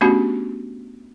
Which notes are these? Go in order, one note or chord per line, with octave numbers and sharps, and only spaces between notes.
A3 B3 C#4 D4 F#4 G4